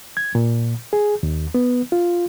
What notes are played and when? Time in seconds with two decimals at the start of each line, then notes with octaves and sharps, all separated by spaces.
0.17 G#6
0.35 A#2
0.93 G#4
1.23 D#2
1.55 B3
1.92 F4